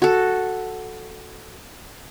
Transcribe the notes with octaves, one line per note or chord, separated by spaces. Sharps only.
F#4 A4